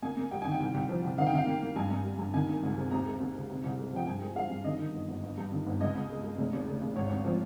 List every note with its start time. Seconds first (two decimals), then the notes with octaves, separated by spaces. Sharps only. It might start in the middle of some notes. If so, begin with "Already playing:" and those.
0.02 A#3 G#5
0.17 A#3
0.31 G3 G5
0.42 D#3 G#5
0.52 G5
0.60 C2
0.74 C2
0.89 F3
1.04 C2
1.18 D#3 F5
1.27 G5
1.33 D#3 F5
1.47 A#3
1.62 A#3
1.76 G2 G#5
1.91 G2
2.04 G3
2.19 G2
2.34 D#3 G#5
2.49 A#3
2.63 C#2
2.77 C3
2.91 D#2 A#5
3.06 G#3
3.20 D#2
3.35 C#3
3.50 C3
3.64 C2
3.79 G#3
3.93 F3 G5
4.06 G2 G#5
4.22 G#3
4.35 G#3 F5
4.50 G2
4.64 D#3 D#5
4.80 D#3
4.93 G1
5.08 G1
5.23 G1
5.38 G2
5.52 D#3
5.66 G1
5.80 C#2 D#5
5.95 C#2
6.09 C#3
6.23 G#3
6.38 F1
6.53 D#2
6.67 C#3
6.82 D#2
6.96 G#1 C#5
7.10 G#1
7.25 F3